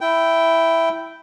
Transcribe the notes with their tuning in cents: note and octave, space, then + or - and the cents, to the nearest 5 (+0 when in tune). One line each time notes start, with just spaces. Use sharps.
E4 +0 G5 -10